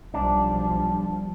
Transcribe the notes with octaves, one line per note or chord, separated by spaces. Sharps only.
B1 F3 G3 D4